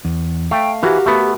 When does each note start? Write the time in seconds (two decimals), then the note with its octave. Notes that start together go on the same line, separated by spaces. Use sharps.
0.05 E2
0.51 A3 F5 G5
0.83 E3 F#4 G4 A#4
1.06 A3 B3